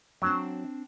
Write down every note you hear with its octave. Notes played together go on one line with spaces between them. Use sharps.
F#3 C4 D4 G5